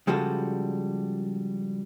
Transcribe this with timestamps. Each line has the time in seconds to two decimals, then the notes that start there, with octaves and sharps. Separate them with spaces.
0.07 C#3 F3 G3 G#3 F#4 A4